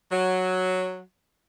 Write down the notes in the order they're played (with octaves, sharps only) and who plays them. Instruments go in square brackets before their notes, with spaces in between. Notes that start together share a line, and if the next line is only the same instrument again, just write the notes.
[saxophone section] F#3